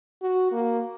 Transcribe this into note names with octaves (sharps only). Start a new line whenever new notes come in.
F#4
A#3